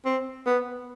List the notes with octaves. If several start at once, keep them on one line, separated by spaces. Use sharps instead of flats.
C4
B3